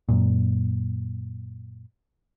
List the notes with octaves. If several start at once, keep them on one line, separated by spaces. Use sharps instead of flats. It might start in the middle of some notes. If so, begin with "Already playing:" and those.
F#2 A#2